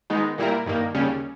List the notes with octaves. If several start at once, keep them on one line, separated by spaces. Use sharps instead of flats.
D#3 G#3 B3 D#4
A#2 G3 A#3 E4 A#4
G2 D#3 A#3
D#2 C#3 G3 C#4